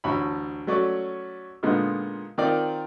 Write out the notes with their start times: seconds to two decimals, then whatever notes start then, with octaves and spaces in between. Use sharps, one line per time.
0.04 A1 D2 C#5 B5
0.67 F#3 A3 C#4 F#4 D5
1.63 A#2 D3 G#3 B3 D#4 F4
2.38 D#3 C4 F4 A#4 D5